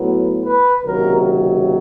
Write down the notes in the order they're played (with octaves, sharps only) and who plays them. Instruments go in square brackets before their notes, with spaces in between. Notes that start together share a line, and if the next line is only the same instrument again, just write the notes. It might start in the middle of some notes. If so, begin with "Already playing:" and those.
Already playing: [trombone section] A2 F#3 B3
B4
C#2 C3 D#3 F#3 A#3 A#4